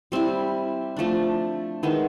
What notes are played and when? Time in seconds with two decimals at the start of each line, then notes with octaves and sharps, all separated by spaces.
0.12 G3 C4 E4
0.97 F3 A3 D4
1.83 D#3 G#3 B3 E4